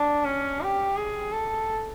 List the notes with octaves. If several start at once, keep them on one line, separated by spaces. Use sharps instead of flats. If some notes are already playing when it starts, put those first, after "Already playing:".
Already playing: D4
C#4
G4
G#4
A4